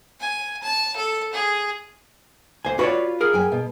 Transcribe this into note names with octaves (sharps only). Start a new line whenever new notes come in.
G#5
A5
A4
G#4
D2 C5 G#5
F4 F#4 B4 C#5 D5
G#4 A#4
F#2 G5 G#5
B2